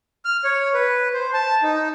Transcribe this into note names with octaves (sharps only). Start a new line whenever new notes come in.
F6
C#5
B4
C5
A5
D#4